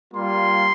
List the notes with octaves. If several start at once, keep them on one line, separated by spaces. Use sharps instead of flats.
G3 A#3 F4 C6